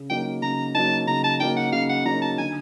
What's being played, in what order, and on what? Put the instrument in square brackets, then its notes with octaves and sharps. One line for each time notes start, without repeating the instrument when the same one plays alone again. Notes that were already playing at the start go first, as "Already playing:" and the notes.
Already playing: [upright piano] C#3
[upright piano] F#3 A#3 D#4 [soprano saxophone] G5
[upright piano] C#3 [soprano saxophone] A#5
[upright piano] F#3 A#3 D#4 [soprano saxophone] A5
[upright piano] C#3 [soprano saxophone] A#5
[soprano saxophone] A5
[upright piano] F#3 A#3 D#4 [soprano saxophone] G5
[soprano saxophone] F#5
[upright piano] C#3 [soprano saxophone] F5
[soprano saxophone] F#5
[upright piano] F#3 A#3 D#4 [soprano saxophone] A#5
[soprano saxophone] A5
[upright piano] D3 [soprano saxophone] G#5